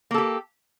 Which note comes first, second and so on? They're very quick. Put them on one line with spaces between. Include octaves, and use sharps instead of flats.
A#3 A4 G4